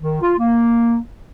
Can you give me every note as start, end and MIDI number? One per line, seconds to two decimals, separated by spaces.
0.01 0.19 51
0.21 0.34 65
0.38 0.97 58